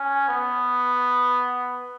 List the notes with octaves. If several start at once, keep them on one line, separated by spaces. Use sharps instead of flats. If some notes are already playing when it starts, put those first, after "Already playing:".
Already playing: C#4
B3